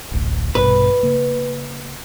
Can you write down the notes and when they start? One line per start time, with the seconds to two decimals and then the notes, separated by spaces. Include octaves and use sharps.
0.11 D1 A1 D2
0.55 A#1 G2 B2 B4
1.03 C#3 A#3